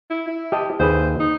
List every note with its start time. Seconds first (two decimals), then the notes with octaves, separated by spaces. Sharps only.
0.10 E4
0.27 E4
0.52 G4 D#5 A5
0.80 D#2 G#4 B4 C5
1.20 D#4